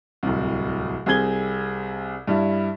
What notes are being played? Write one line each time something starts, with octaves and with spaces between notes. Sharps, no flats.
D1 C2
C2 C3 G#4 G#6 G7
G2 G3 E4